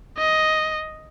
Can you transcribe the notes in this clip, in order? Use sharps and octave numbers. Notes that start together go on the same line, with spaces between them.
D#5